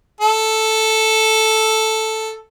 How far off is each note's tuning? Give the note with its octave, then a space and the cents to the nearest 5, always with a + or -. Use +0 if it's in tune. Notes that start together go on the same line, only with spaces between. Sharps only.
A4 +0